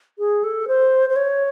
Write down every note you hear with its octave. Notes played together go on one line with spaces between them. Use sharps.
G#4
A4
C5
C5
C#5